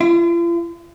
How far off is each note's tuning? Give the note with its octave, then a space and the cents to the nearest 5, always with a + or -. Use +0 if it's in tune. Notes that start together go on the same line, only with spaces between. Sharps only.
F4 -45